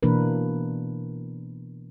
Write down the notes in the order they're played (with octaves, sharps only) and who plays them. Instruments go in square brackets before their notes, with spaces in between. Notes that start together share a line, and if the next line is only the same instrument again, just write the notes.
[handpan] B2 E3 A#3 D4 A#4 B4